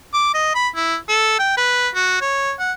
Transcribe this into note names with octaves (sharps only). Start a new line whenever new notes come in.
D6
D#5
B5
E4
A4
G5
B4
F#4
C#5
F#5